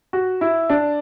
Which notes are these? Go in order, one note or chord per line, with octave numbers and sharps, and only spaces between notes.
F#4
E4
D4